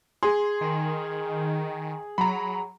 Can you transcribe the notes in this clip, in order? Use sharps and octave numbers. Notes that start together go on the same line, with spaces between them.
G#4 C6
D#3
F#3 A#5 B5